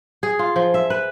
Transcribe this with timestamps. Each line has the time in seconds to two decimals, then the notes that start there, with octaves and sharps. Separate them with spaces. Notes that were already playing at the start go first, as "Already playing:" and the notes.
0.23 G#4
0.39 F4
0.56 F3
0.74 E5
0.90 B4